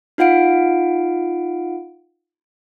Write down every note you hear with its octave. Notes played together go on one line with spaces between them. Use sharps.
D#4 F4 F5 F#5 D7